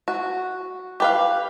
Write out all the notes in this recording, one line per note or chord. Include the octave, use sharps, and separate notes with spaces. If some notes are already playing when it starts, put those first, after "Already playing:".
F#4
G4 B4 F5